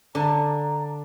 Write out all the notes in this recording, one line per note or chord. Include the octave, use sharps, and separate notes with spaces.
D3 D4 A#5